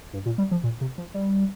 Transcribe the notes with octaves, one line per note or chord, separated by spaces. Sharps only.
G2
A#2
G3
F3
A#2
C3
F3
G3